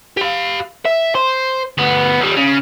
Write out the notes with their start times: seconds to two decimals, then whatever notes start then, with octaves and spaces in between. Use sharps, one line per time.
0.17 G4 F5
0.85 E5
1.15 C5
1.78 D2 B3
2.21 D#2 G3
2.37 C#3